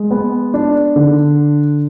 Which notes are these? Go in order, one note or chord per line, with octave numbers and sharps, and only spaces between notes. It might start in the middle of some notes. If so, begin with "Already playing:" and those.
Already playing: G#3
B3
D4
D3